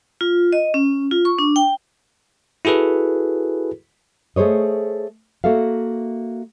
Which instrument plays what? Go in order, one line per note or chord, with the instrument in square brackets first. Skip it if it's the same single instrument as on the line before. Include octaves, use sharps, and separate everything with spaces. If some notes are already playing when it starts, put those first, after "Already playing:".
[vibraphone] F4
D#5
C#4
F4
C#6
D4
G5
[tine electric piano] E4 F#4 G#4 A4 B4
[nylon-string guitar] A3 G#4 C5 C#5 D#5
A#3 F#4 A4 E5 F5